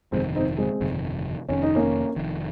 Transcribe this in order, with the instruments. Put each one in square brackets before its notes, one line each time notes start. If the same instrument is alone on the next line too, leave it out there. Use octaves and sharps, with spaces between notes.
[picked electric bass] G1 F2 C3 D#3 [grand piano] G#3 C4
[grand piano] C4 D#4
G#3 C4
[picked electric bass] G1 F2 C3 D#3
[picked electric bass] F1 F2 D#3 [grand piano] C#4
[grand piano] D#4
A#3 C#4
[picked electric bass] F1 F2 D#3